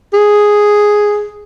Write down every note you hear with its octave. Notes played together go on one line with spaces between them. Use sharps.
G#4